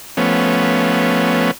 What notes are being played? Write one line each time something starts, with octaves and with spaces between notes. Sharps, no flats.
F3 A3 B3 C#4